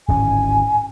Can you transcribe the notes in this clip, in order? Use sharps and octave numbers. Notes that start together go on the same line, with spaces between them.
D1 G#1 C#4 G#5